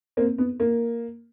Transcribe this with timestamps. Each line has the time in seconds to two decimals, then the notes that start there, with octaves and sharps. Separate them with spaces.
0.17 A#3 C4
0.38 B3
0.60 A#3